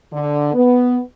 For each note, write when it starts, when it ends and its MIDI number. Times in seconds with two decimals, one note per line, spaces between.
0.12 0.53 50
0.53 0.99 59